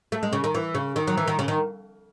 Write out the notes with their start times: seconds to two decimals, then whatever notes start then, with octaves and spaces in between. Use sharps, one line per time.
0.12 A3
0.23 G#3
0.33 C#3
0.44 D#3
0.55 E3
0.75 C#3
0.96 D#3
1.07 F#3
1.17 E3
1.27 D#3
1.39 C#3
1.48 D#3